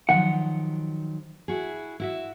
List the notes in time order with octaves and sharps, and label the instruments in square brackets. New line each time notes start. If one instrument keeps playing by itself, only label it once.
[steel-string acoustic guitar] D#3 F3 F#3 [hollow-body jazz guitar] F#5
[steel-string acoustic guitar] E4 F#4 G#4
E4 F#4 E5